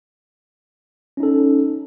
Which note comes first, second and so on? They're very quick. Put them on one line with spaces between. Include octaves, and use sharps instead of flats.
C#4 D#4 A4